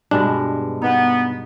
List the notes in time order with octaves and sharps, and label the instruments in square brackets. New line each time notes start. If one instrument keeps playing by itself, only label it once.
[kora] G2 B2 G#3 [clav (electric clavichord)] D4
[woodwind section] B3 [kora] D#4